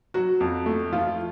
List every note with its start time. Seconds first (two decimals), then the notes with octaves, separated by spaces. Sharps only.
0.14 F#3 F#4
0.40 F2
0.66 A3
0.93 F3 F4